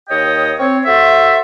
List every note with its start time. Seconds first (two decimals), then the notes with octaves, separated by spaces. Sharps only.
0.09 D#2 C#5 D#5 G5 D#6
0.58 C4 C#5
0.85 F#4 A4 C5 E5